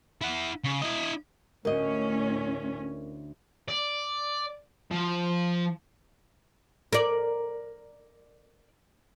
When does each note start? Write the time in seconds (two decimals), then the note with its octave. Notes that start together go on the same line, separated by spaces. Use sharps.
0.21 E4 F#5
0.64 C#3
0.82 E4 D#5
1.65 D2 A2 C#4 A#4 D#5
3.68 D5
4.91 F3
6.93 A#4 D5